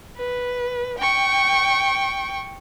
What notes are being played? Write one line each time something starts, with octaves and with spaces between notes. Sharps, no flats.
B4
G5 C#6